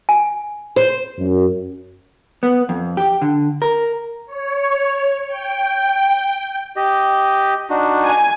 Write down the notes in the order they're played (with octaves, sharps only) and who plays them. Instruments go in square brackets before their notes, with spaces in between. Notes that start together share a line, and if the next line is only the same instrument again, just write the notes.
[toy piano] G#5
[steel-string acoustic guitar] C5
[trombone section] F#2
[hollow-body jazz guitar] B3
F2
G4
D3
A#4
[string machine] C#5
G5
[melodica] G4 D#5
D4 D#4 F#4
[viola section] G#5